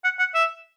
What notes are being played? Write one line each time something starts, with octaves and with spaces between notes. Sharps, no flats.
F#5
F#5
E5